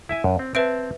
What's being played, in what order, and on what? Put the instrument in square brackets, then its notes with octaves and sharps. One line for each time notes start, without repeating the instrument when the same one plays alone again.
[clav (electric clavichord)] E4 E5 G#5
F#2
C4
[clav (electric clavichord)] C4 A5 [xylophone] B4 E5 D7